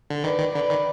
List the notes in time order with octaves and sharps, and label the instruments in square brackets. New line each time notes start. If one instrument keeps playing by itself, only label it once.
[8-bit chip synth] D3
[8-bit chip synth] D#3 [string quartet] B4 D5
[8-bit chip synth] D#3
[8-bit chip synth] D3 [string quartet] B4 D5
[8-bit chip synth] D#3